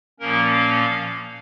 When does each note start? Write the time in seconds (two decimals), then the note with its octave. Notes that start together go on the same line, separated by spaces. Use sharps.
0.20 A#2 F3 A#3 C#4 A#4
0.52 F5